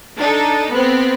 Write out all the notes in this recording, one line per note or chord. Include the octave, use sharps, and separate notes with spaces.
D4 D#4 A4
B3 C4